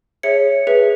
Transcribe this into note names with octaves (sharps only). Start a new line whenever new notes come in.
G#4 C#5 E5 C#7
G#4 B4 E5